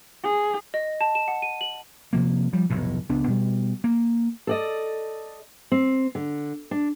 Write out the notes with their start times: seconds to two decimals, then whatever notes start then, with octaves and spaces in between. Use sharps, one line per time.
0.23 G#4
0.74 D#5
1.01 A5
1.15 E7
1.28 F#5
1.42 D#7
1.61 F#7
2.13 C3 F3 A#3
2.53 F3 G3
2.70 F1 B1 A2
3.09 C#2 B3 D4
3.27 B2 G3
3.84 A#3
4.47 A4 D5 D#5
5.72 C4
6.15 D3
6.71 D4